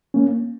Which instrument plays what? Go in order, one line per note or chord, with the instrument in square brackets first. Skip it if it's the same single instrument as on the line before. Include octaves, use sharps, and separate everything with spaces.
[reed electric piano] A#3 C#4